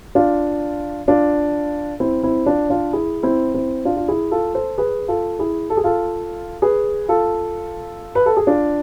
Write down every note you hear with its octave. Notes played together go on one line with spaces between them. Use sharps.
D4 F4
D4 F4
C4 E4
C4 E4
D4 F4
D4 F4
E4 G#4
C4 E4
C4 E4
D4 F4
F4
E4 G#4
F4 A4
A4 C5
G#4 B4
F4 A4
E4 G#4
A4
G#4
F4 A4
G#4 B4
F4 A4
B4
A4
G#4
D4 F4